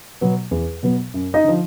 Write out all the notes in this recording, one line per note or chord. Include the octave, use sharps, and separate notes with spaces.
B2 F#3 B3
E2
B2 F#3 B3
F#2
D#4 D#5
D3 F3